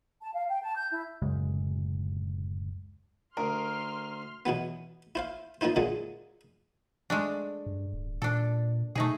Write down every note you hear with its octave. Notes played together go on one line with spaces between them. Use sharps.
A5
F5
G5
A5
G6
E4
D1 F#2 C#3 G#3
D2 A#4 C6 F6
B2 E3 F#3 B3
E4 C5 F5
F3 A#3 D#4 E4 C5
A#2 D3 F#3 G#3
G#3 A3 D4
G2
D1
A#2 D4 A4
B2 A3 D#4 G#4